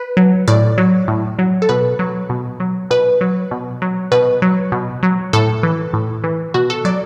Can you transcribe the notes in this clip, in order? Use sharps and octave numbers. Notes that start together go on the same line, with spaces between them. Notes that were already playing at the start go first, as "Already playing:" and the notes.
Already playing: B4
F#3
A2 D5
F#3
A2
F#3
A4
B2 B4
F#3
B2
F#3
B2 B4
F#3
B2
F#3
B2 B4
F#3
B2
F#3
A2 A4
E3
A2
E3
B2 F#4
A4
F#3 D5